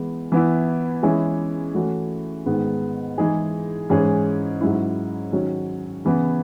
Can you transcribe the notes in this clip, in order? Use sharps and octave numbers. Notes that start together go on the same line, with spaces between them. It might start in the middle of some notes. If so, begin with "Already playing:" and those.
Already playing: E3 G#3 B3
E3 B3 E4
E3 G#3 C#4 E4 G#4
E3 A3 C#4 F#4
G#2 D#3 G#3 B3
E3 G#3 D#4 G#4
G#2 E3 G#3 C#4 G#4
G#2 F#3 C#4 E4
D#3 F#3 C#4 F#4
C#3 E3 B3